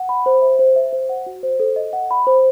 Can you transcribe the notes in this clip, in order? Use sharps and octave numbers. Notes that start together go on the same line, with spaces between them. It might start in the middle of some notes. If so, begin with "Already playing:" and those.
Already playing: F#5
B5
C5
E5
C5
E5
C5
F#5
F#4
C5
A4
D#5
F#5
B5
C5